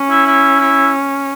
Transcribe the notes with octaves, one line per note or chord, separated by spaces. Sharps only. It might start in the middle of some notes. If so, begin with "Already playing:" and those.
Already playing: C#4
E4
E4
E4